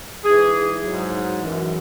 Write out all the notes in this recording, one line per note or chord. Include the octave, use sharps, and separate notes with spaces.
G#2 E3 G#4
G#2 F#3
F#2 E3